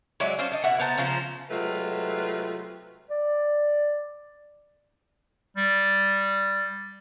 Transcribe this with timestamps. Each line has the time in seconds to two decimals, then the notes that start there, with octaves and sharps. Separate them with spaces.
0.20 F#3 G#3 D5 E5
0.39 C#4 D4 C5 F5
0.52 D#5 A5
0.64 B2 E4 F#5
0.79 B3 C5 A5 A#5
0.98 C#3 F3 C5 A#5
1.50 C3 F#3 G#3 A3 F4 B4
3.10 D5
5.57 G3